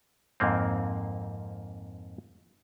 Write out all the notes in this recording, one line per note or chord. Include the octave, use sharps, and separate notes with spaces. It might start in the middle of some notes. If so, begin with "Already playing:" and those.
F2 G#2 A#3 C4